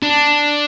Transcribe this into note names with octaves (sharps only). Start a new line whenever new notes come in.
D4